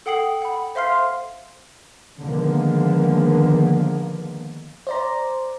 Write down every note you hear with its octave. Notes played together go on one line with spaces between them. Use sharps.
A4 F#5 G5 D#6 C7 F#7
F#5 B5
C5 E5 F5 C6 F6 C7
D3 D#3 F3 G#3 A#3 B3
C5 D5 A#5